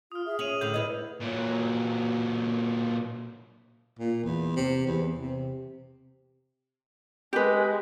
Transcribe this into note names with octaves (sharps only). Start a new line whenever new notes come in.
F4 D#6 F6
G#4 E5
C#4 C#5 D#7 F7 F#7
A2 D3 G6 F7
G#2 E4 B4 C#5 D#5
A#2 F#3
A#2
E2
C3
E2
C3
G#3 G4 B4